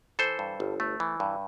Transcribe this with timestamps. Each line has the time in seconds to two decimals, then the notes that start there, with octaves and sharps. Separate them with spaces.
0.19 E3 A4 C5
0.39 G2
0.60 G1
0.80 A3
1.00 E3
1.20 G2